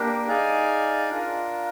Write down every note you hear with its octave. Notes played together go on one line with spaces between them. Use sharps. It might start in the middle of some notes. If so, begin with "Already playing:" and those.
Already playing: A#3 D4 G4 A#4
D#4 G#4 D5 F5 G#5
D4 F4 A#4